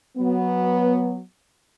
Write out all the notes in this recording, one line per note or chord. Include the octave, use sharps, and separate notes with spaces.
F#3 B3